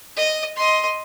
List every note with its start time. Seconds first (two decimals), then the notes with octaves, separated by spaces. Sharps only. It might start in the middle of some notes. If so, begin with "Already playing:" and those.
0.16 D#5
0.56 D#5 C6